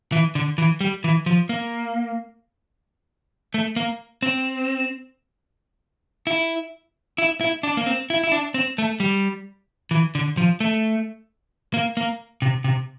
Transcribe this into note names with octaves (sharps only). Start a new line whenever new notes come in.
E3
D3
E3
G3
E3
F3
A#3
A3
A#3
C4
E4
E4
E4
D4
A#3
C4
E4
E4
D4
C4
A3
G3
E3
D3
F3
A3
A#3
A#3
C3
C3